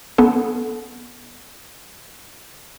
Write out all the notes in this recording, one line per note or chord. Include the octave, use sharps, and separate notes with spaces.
B3 A4